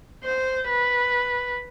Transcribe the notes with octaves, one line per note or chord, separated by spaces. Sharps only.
C5
B4